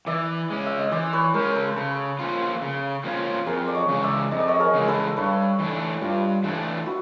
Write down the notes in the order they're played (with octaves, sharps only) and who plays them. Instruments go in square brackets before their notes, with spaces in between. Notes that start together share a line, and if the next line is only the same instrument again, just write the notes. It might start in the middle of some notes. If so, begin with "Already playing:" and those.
[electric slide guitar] E3 [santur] D5 E5
[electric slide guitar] G#3 C#4
[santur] E5
D#5
[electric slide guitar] E3 [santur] C5 D5
[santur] B4 C#5
[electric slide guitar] G#3 C#4 [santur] A#4 C5
[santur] A4 B4
C5
[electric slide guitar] C#3 [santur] A4 B4
[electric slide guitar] F3 A#3 C#4 F4
C#3
F3 A#3 C#4 F4
[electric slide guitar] F2 [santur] G#4 A#4
[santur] D5
C#5 D#5
[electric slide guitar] C#3 E3 G#3
[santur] D5 E5
[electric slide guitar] F2 [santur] D#5
[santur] D5
C#5 D#5
G#4 A#4
[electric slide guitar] C#3 E3 G#3
[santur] A4 B4
[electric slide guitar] G2 [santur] B4 C#5
[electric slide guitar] E3 A3 D4
[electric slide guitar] G2 [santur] F4 G4
[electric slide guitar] E3 A3 D4
[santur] E4 F#4